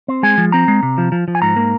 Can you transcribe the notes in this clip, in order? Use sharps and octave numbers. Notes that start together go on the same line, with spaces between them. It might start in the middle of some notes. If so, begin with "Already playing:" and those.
C4
G#3 G#5
F3
C4 A#5
G#3
C3
F3
F3
F3
G#5
G#2 A#5
A#3